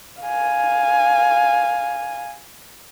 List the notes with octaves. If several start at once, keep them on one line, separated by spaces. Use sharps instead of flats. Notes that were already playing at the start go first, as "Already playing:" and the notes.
F5 G#5